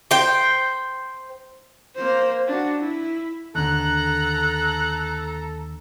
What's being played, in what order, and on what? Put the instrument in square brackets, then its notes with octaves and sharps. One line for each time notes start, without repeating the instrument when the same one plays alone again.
[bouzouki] C5 G5
[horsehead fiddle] A#3 C5
D4 F#4
E4
[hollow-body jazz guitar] D#2 D3 [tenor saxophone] A4 [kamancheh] A#5 [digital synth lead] F#6